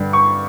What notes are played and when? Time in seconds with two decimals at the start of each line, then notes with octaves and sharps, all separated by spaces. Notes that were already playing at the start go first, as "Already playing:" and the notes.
Already playing: G2 D3 G3
0.13 C#6